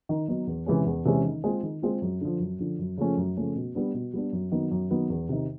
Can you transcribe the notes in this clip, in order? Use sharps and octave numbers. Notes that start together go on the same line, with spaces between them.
D#3
F#3 B3 D#4
E2
C3 E3 G#3 C#4
E2
C3 E3 G#3 C#4
D#3
G#3 C4 F4
D#3
G#3 C4 F4
F#2
D3 F3
F#2
D3 F3
F#2
C#3 F3 A3 C#4
F#2
C#3 F3 A3 C#4
B2
G3 B3 D4
B2
G3 B3 D4
F#2
D#3 F#3 B3
F#2
D#3 F#3 B3
E2
C3 D#3